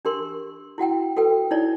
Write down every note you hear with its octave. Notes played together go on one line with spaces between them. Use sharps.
D4 G4 A#4 C6
E4 F#4 F#5 G5
F#4 A4 B4 G5
D#4 E4 C#5 D5